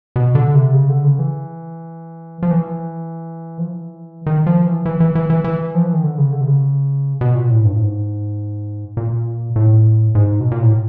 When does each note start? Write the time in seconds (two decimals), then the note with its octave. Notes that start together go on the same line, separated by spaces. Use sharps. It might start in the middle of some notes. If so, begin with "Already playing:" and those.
0.16 B2
0.35 D3
0.55 C3
0.74 C#3
0.89 D3
1.04 C#3
1.19 E3
2.43 F3
2.51 E3
3.58 F3
3.68 E3
4.26 D#3
4.46 F3
4.66 E3
4.85 E3
5.00 E3
5.15 E3
5.30 E3
5.44 E3
5.75 F3
5.84 E3
5.93 D#3
6.04 D3
6.18 C#3
6.32 D3
6.41 C3
6.47 C#3
7.21 B2
7.35 A#2
7.50 A2
7.65 G2
7.73 A2
7.79 G#2
8.97 A#2
9.56 A2
10.15 G#2
10.40 B2
10.51 A#2
10.62 A2